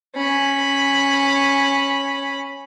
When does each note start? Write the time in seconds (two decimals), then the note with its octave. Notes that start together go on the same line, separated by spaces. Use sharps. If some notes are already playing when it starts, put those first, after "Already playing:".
0.15 C#4 B5